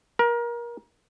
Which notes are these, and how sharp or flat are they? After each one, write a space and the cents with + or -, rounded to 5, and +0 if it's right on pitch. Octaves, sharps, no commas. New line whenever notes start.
A#4 +25